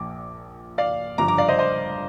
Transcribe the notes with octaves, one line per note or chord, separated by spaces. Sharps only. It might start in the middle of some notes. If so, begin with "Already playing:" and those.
Already playing: A#1 A#2 F3 D6
D5 F5
G1 G2 F3 A#5 D6
A#5 D6
D5 F5
C5 D#5
C5 D#5